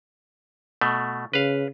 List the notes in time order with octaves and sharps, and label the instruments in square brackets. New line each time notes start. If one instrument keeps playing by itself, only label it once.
[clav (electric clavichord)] B2 A3
[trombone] C#3 [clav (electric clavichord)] B4 F5